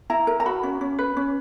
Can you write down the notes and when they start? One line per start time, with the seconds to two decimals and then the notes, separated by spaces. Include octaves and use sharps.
0.10 E4 A#5
0.27 A#4
0.40 A#5
0.46 F#4 B5
0.63 C#4
0.81 C#4
0.99 B4
1.17 C#4